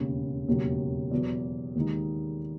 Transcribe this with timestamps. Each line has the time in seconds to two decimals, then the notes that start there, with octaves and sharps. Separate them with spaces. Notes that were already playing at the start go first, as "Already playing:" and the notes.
Already playing: E1 D#2 C#3
0.48 E1 D#2 C#3 F#3
1.11 E2 B2 F#3
1.75 D#2 D#3 G#3 D#4